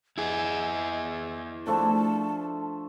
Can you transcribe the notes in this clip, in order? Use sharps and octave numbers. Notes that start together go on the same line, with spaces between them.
E4 G#4 D#5
F3 A3 D4 A5